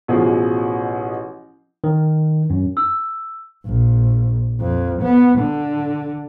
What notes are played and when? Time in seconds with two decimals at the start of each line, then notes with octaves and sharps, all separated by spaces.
0.08 A1 B2 F3 G#4
1.84 D#3
2.50 F#2
2.77 E6
3.66 A#1
4.60 F2
5.03 B3
5.39 D3